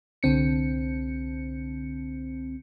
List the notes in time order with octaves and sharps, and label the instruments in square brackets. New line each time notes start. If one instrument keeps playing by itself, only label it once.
[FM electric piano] C2 D3 C4 C#7